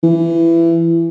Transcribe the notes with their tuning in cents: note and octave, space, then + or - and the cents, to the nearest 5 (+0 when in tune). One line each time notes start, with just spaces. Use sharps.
E3 +20